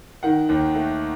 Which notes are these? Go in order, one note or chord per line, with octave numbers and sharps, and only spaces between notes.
D#3 F#5
D#2
A3